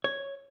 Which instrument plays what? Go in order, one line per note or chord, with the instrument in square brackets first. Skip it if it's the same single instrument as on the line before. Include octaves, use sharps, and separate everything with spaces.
[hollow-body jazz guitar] C#5